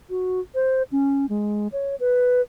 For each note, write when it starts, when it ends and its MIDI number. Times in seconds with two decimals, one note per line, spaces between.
0.10 0.40 66
0.55 0.83 72
0.92 1.29 61
1.29 1.68 56
1.72 1.96 73
2.00 2.41 71